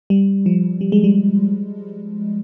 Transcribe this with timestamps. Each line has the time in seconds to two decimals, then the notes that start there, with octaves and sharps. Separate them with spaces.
0.10 G3
0.46 F3
0.81 G3
0.92 G#3
1.04 G3